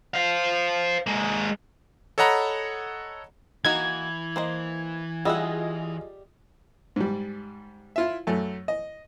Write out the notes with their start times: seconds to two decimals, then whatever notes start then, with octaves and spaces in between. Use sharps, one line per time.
0.14 C5 F5
1.07 G#3 A#3
2.18 A4 C#5 D#5 F#5 A#5 B5
3.65 E3 A#3 D#4 F#4 G#6
4.36 A#3 C5 D#5
5.25 G3 F4 G#4 D#5 E5 F#5
6.96 G#2 G3
7.96 E4 F4 E5
8.27 F#2 A3
8.68 D#5